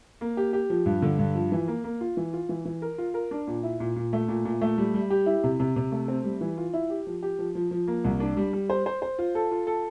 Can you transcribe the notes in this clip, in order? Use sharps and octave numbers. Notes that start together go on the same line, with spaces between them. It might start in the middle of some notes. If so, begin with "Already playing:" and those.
A#3
G4
G4
F3
G2
D3
G2
F3
E3
A#3
A#3
F4
E3
F4
E3
E3
A#4
F4
A#4
D4
A#2
E4
A#2
A#2
A3
A#2
A#2
A3
G3
G3
G4
E4
C3
C3
C3
A3
C4
G3
E3
F4
E4
G4
F3
G4
F3
F3
F3
A#3
C2
D4
G3
G3
C5
C5
C5
F4
A4
F4
A4